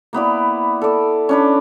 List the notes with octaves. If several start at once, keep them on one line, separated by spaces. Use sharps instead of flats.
A#3 B3 E4 D5
A4 D5
C#4 D4 B4